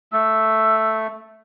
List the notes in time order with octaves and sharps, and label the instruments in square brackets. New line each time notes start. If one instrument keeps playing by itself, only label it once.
[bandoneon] A3 [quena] E6